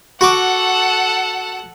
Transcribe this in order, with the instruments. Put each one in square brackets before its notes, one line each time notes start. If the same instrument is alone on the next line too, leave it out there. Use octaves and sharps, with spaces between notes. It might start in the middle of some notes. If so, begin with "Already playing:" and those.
[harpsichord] F#4 C#6 D6 [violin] A4 F#5